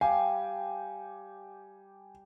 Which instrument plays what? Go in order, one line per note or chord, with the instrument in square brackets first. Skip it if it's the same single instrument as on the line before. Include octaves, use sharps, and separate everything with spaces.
[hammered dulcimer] G3 G4 [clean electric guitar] F5 [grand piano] G#5